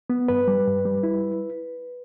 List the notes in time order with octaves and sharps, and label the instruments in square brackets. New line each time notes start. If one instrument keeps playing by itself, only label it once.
[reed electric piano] B3
G2 B4
G3
G2
G3
E4